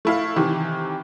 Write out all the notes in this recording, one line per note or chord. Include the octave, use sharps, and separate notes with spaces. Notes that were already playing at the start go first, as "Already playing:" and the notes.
A3 E4 F5
C3 D#3 E3